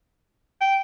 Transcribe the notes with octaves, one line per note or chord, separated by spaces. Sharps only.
G5